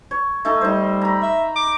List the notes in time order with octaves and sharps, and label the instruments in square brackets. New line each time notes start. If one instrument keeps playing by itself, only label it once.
[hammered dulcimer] C#5
A3 D#4 A4
[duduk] G3 [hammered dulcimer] D#4 C5
[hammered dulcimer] A#5 B5
[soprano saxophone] E5
D6